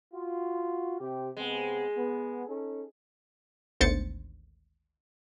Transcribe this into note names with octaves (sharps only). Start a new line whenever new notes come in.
F4 F#4
C3 G4
C3 G#3 B3 C4
B3
C#4 D#4 A4
G#1 D2 B3 C5 A6 C#7